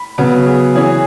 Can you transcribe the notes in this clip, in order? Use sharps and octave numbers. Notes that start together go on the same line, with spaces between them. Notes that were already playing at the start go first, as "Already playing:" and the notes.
Already playing: B5
C#3 F#3 B3
G#4
E3 C#4 G#4